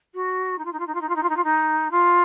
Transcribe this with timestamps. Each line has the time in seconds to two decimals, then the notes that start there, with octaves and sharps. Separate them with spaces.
0.14 F#4
0.58 D#4
0.65 F4
0.72 D#4
0.79 F4
0.87 D#4
0.94 F4
1.01 D#4
1.09 F4
1.15 D#4
1.23 F4
1.29 D#4
1.36 F4
1.44 D#4
1.91 F4